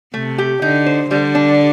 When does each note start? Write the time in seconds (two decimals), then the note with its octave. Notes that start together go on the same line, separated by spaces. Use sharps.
0.14 C3 A3
0.38 G4
0.62 D3 D#4
0.86 C5
1.10 D3 G3
1.35 D4